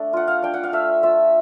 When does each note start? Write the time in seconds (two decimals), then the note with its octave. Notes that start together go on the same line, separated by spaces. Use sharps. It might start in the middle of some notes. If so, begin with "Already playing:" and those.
Already playing: A3 D4
0.13 F4 F#5
0.28 F5
0.42 D4 G5
0.54 F#5
0.64 F5
0.72 A3 E5
1.03 F4 E5